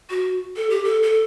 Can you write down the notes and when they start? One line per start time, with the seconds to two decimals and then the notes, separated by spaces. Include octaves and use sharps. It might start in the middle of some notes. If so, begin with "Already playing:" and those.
0.10 F#4
0.56 A4
0.70 G4
0.84 A4
1.03 A4